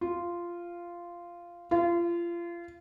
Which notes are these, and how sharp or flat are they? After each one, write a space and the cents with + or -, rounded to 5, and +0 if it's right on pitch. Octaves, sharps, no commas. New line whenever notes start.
F4 -10
F4 -30